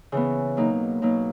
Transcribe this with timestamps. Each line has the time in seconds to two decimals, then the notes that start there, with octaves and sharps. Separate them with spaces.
0.12 C#3 E3 B3
0.57 B2 F#3 A#3 D#4
1.02 B2 F#3 A#3 D#4